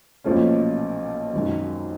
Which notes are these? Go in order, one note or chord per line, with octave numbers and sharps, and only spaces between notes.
B1 A#2 F3 A3 C#4
G#1 F#2 D#3